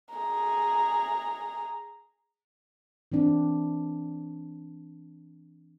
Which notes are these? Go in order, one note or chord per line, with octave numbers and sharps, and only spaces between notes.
G#4 A#5
E3 C4 D4